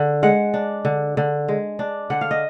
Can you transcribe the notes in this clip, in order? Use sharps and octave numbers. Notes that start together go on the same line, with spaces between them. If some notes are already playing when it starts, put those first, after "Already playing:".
Already playing: D3
G#3 F#5
D4
D3
D3
G#3
D4
D3 F#5
F5
D#5